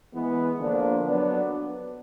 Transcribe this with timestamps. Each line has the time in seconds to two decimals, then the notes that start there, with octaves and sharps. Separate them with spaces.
0.14 E3 G#3 B3
0.59 D3 F3 A#3 D4
1.04 F#3 B3 D4